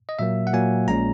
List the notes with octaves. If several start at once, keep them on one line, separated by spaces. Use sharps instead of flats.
D#5
A#2 F#3 A#3 E5
F#5
A#2 F#3 A#3 G#5
A#1 A#2 G#3 C#4 A#5